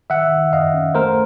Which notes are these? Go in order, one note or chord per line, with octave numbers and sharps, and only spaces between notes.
D#3 E5 F#5
D#3
F#2 D#5 F5
C#4
A3 A#4 C5